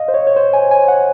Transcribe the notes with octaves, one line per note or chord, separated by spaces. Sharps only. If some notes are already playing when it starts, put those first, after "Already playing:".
Already playing: D#5 F5
C5
C#5
C#5
C5
G#5
G#5
F#5